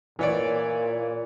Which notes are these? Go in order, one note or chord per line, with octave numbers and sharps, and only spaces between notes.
A#2 E3 C#5 D5